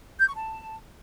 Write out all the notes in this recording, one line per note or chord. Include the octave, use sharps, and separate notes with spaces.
G6
C#6
A5